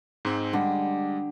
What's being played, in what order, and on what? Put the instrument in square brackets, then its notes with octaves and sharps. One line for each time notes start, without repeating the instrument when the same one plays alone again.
[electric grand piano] G#2 G#3 C4
[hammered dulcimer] D3 G4 [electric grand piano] G3 G#3